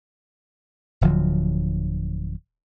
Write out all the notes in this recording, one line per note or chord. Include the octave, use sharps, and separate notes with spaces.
D1 D3 F3 F#3